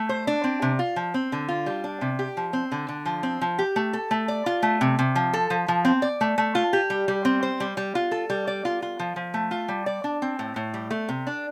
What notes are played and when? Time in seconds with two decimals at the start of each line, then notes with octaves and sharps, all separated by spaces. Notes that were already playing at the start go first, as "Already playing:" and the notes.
Already playing: A3
0.09 C5
0.27 D4
0.44 C4
0.62 C3
0.79 F4
0.96 F3
1.14 C4
1.32 D3
1.48 F4
1.66 G3
1.84 D4
2.01 C3
2.19 G4
2.37 F3
2.53 C4
2.72 D3
2.89 D3
3.06 F3
3.23 C4
3.41 F3
3.59 G4
3.76 A3
3.93 A4
4.11 A3
4.28 D5
4.46 F4
4.63 A3
4.81 C3
4.99 C3
5.16 F3
5.33 A4
5.50 F3
5.68 F3
5.85 C4
6.02 D5
6.21 A3
6.38 A3
6.55 F4
6.73 G4
6.90 G3
7.08 G3
7.25 C4
7.43 C5
7.60 G3
7.77 G3
7.95 F4
8.11 A4
8.30 G3
8.47 D5
8.65 F4
8.82 F4
8.99 F3
9.16 F3
9.34 A3
9.51 F4
9.68 G3
9.86 D5
10.04 D4
10.22 C4
10.39 A2
10.56 A2
10.74 G3
10.91 A3
11.09 C3
11.27 D4